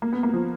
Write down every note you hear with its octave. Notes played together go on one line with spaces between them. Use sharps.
A#3
B3
A#3
F3